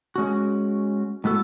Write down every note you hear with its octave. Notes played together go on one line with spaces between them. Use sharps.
G#3 C#4 F#4
A2 G#3 B3 F#4 A4